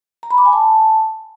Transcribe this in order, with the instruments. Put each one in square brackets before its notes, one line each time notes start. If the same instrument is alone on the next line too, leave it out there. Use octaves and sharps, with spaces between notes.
[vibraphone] A#5
B5
D6
G#5
A5